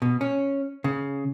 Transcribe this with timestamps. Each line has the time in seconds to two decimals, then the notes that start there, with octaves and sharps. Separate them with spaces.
0.02 B2
0.21 C#4
0.84 C#3